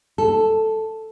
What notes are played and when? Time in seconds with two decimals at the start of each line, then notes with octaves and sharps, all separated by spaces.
0.18 A4